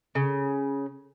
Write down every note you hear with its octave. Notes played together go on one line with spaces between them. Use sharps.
C#3